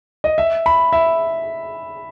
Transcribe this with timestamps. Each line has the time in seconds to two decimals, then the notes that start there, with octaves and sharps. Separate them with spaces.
0.24 D#5
0.38 E5
0.66 B5
0.93 E5